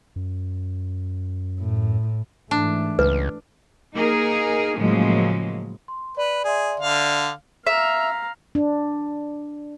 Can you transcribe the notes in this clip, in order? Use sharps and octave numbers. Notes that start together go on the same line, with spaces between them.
F#2
A2
G#2 E3 A3 D4
C#2 B4
A#3 D#4 G#4 A#4
A2 C#3 F3 F#3 G#3 A#3
C6
B4 D5
G#4 D5 E5 C6
D3 F5
E5 F5 A#5
D4